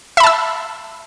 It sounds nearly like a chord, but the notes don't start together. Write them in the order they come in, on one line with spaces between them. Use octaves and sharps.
E5 B5 A5 E6